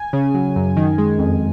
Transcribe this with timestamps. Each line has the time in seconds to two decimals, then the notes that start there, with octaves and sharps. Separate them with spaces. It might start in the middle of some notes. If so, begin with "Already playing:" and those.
Already playing: G#5
0.13 C#3
0.34 F#3
0.56 F#2
0.77 D#3
0.98 G#3
1.19 F2